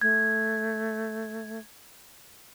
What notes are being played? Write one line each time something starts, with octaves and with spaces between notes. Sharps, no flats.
A3 G#6